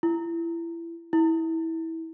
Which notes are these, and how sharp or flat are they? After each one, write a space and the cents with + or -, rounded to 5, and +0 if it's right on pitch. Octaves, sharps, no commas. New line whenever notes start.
E4 +25
E4 -20